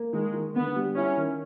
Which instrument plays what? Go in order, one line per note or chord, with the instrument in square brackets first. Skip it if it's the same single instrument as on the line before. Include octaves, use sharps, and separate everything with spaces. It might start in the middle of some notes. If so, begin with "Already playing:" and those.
Already playing: [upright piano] A#3
[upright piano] D#3 [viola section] G#3
[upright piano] D#3
[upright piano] D3 [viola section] B3
[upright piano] G3
[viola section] C#4 [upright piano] E4
[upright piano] D#3